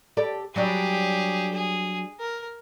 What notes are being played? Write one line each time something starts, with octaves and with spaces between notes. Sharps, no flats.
G4 A4 D5
F#3 G3 D4 G4 G#4
G#4
A#4